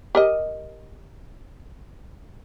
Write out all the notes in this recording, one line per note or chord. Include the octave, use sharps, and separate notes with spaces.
G4 A#4 D#5